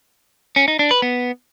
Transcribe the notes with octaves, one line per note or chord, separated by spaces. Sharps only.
C#4
D#4
D4
B4
B3